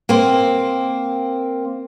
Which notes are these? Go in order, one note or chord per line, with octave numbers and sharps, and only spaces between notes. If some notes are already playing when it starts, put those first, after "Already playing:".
A#3 C4